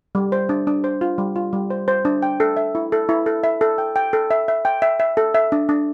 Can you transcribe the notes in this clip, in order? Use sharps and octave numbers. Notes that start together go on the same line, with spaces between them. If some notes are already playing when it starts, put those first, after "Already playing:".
G3
C5
D4
D4
C5
F4
G3
F4
G3
C5
C5
D4
G5
A4
E5
E4
A4
E4
A4
E5
A4
G5
G5
A4
E5
E5
G5
E5
E5
A4
E5
D4
D4